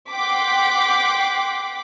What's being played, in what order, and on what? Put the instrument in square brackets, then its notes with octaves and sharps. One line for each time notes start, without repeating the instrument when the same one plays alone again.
[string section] F#5 G5 C6 D6 B6